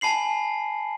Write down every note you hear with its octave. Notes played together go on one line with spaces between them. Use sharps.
G#5 A5 B5 C7 F#7